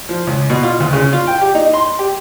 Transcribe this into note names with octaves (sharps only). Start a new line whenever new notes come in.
F3
C#2
B2
F4
D2
C#3
F4
G5
G4
D#4
C6
G4